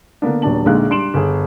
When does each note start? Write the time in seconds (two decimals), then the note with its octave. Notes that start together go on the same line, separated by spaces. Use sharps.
0.22 D3 A#3 B3 D4
0.42 D#1 F#3 D4 A5 F#7
0.66 A#1 D3 G#3 D#4 F5 F#6
0.90 G3 D4 C6 D7 E7 F#7
1.14 G1 G#4